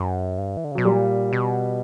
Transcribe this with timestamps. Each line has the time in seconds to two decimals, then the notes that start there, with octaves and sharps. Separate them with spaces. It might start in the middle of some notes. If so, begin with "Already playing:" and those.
Already playing: F#2
0.38 G2
0.57 E3
0.64 D3
0.71 C#3
0.75 B2 F#3
0.85 A#2 G3
1.33 B2